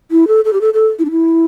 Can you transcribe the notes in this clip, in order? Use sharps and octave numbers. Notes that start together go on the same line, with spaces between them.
E4
A4
A4
G4
A4
A4
E4
D4
E4